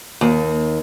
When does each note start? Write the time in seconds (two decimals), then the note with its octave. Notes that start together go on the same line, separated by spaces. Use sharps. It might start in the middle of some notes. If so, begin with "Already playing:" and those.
0.21 D#2